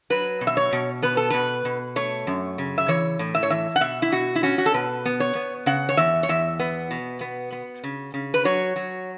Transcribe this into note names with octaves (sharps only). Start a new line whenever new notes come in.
F#3 B4
B2
E5
C#5
B2
B3 B4
A4
B2 B4
B2
A3 C#5
F#2
C#3
E5
E3 C#5
A2
E5
C#5
E3 E5
F#5
B2 E5
E4
B2 F#4
E4
C#4 F#4
F#4
A4
B2 B4
B3
C#5
B3
C#3 F#5
C#5
E2 E5
C#5
E2 E5
B3
B2
B3
B3
C#3
C#3
B4
F#3 C#5
F#3